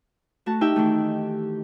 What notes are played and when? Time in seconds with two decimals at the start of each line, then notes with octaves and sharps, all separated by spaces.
0.46 A3 F#4 A5
0.61 D#4 G4 E5 G5
0.76 D#3 E3 A3